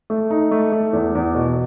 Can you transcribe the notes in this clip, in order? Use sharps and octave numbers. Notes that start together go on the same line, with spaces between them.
A3
D#4
A3
A3
E2
E2
B2